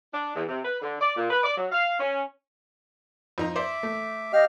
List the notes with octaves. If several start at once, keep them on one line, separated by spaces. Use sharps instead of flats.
D4
E2
C3
B4
D3
D5
A#2
B4
D5
F#3
F5
C#4
F2 D#4 A#5
C5 D5 E5 D6
A3
G4 D#5 F5 F6